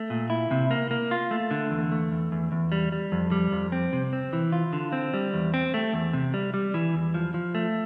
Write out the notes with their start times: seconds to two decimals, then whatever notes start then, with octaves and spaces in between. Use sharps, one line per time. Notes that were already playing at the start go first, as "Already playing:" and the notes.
Already playing: A3
0.10 A#2
0.30 E4
0.51 C3
0.71 A#3
0.91 A#3
1.11 F4
1.31 A3
1.51 D3
1.71 E2
1.92 A3
2.11 E2
2.32 E2
2.52 E2
2.72 G3
2.92 G3
3.12 F2
3.32 G3
3.52 F2
3.72 C4
3.93 C3
4.13 C4
4.33 E3
4.52 F4
4.73 D3
4.93 C4
5.14 G3
5.34 E2
5.54 C4
5.74 A3
5.93 E2
6.13 C3
6.34 G3
6.54 G3
6.74 E3
6.94 E2
7.14 F3
7.34 F3
7.55 A3